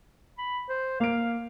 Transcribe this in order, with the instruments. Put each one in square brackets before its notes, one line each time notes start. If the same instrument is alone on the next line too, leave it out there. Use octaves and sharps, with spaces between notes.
[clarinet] B5
C5
[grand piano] A#3 D7 [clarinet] F5